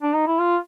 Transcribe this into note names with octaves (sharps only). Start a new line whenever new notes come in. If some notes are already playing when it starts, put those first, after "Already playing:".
D4
D#4
E4
F4